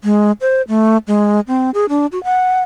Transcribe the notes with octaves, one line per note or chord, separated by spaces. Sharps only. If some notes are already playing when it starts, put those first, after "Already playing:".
G#3
C5
A3
G#3
C4
G#4
D4
F#4
F#5